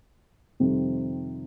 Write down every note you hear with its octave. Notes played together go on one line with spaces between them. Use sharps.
F2 C3 D#3 G3 C4